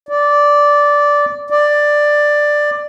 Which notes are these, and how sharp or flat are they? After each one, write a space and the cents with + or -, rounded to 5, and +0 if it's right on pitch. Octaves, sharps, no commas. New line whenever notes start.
D5 -10
D5 +10